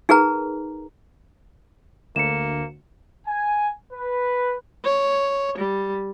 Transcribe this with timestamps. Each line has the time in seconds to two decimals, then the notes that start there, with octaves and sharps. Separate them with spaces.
0.09 D#4 G#4 A#4 B4 A#5
2.16 D2 A#3 C#7 E7
3.27 G#5
3.93 B4
4.84 C#5
5.58 G3